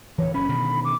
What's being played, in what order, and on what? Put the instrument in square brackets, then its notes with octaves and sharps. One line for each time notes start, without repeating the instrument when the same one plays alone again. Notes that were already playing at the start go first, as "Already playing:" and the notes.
[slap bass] D1 E3 [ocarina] C#5
[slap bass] F#1 C#4 [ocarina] B5
[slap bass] B2 D3 D#3
[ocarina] D6